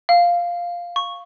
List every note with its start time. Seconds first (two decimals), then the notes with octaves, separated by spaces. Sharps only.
0.09 F5
0.96 C#6